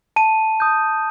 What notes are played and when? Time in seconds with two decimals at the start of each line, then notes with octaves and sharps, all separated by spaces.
0.16 A5 D#7
0.60 D#6 G6